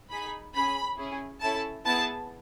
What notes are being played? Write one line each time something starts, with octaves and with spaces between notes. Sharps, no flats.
D#4 G#4 B5
C#4 G#4 B5
C#4 E4 G#4
C#4 E4 A4 A5
B3 E4 G#4 A5